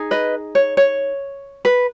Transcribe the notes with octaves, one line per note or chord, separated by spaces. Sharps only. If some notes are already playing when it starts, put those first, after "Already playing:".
Already playing: D#4 G#4
B4 D#5
C#5
C#5
B4